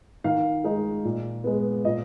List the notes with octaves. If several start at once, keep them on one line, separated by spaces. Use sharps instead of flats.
D#3 F5
G#3 D#4
A#2
G#3 B3
A#2 D#5